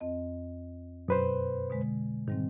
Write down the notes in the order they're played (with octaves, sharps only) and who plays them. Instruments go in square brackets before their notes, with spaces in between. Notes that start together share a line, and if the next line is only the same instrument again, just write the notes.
[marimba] F2 C4 D#5
[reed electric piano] F#2 B4 C5 [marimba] B2
[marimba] B2 D3 G#3
[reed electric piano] G#2 [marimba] D#3 G3 C4